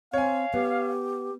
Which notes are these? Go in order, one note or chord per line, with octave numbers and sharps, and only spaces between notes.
C4 C#5 F5 G#5
B3 G4